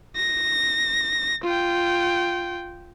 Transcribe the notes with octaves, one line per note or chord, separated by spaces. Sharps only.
A#6
F4 G5